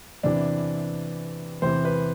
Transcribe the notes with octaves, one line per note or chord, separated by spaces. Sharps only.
E2 C3 E3 D4
E2 C3 E3 C5
B4